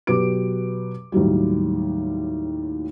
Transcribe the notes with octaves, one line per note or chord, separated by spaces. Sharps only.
B2 F#3 G4 B4 D6 D7
D#2 A2 F#3 G3